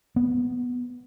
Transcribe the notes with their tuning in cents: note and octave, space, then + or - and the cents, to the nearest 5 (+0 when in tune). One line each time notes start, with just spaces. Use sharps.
B3 +0